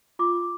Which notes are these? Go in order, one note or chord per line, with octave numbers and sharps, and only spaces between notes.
F4 D6